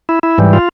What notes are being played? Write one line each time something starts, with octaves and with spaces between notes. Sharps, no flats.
E4
E4
G#2 E3 G3
F4